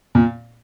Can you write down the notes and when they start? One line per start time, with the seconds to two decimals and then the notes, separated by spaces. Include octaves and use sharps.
0.15 A#2